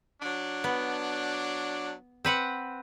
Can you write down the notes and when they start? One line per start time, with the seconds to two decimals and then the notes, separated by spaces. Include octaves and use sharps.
0.21 F#3 D4
0.64 B3
2.25 C4 B4 F#5